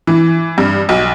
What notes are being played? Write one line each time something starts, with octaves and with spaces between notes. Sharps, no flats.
E3
G2
B1